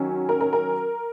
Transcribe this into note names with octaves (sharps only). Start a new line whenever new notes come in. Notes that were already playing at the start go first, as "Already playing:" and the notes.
Already playing: D#3 F#3 C#4
A#4
A#4
A#4